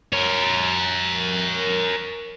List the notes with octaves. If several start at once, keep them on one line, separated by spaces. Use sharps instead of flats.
A#4 C#5